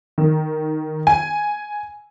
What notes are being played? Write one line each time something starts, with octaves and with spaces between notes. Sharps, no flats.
D#3
G#5